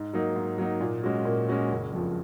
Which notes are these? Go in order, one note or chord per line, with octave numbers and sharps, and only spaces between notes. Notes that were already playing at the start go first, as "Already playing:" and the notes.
Already playing: G#2
F#3 A#3 D#4
G#2
F#3 A#3 D#4
A#2
G#3 C#4 F#4
A#2
G#3 C#4 F#4
F#1
F2 F3